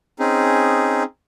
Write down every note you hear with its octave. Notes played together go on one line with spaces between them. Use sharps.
C4 C#4 D#4 G#4